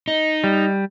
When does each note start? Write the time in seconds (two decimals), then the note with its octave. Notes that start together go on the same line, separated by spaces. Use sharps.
0.08 D#4
0.44 G3